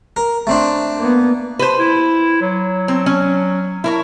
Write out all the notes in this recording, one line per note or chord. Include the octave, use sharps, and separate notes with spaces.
A#4
A3 C4 D4
A#3 B3
B4 C5
E4
F#3
C4
C#4
E4 A#4 C#5